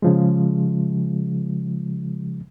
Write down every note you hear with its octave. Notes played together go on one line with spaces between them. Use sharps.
C#3 F3 G#3